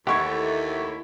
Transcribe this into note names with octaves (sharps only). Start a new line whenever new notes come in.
D#2 E3 A3 E4 G4 F#5 C#6 G#6